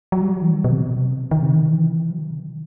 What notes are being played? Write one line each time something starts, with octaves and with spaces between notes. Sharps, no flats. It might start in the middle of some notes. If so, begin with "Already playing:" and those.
F#3
G3
F#3
E3
D#3
B2
C3
B2
C3
D#3
C3
D#3
E3
F#3
D#3
C3
D#3